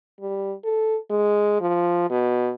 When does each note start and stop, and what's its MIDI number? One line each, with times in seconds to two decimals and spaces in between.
0.21 0.53 55
0.64 0.97 69
1.10 1.60 56
1.61 2.06 53
2.10 2.51 47